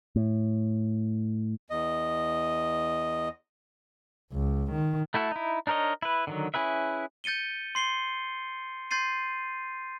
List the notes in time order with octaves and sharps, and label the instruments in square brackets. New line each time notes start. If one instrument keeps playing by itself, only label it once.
[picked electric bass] A2
[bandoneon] E2 D#5
[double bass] C#2
D#3
[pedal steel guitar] A3 E4 F#4 A4
D#4 E4
D4 D#4 A#4 C#5 D#5
E4 B4
D3 D#3 F#3
C#4 E4 G#4 B4 E5
[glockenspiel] G6 A6 C#7 D#7 G7
C6 C7 G7
C6 G6 A6 C7 D#7